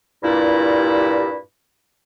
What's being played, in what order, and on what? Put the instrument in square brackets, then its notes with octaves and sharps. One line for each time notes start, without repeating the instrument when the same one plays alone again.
[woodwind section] G2 A#2 E4